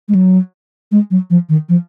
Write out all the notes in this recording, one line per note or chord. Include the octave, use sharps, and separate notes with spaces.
G#3
F#3
G#3
F#3
F3
D#3
F3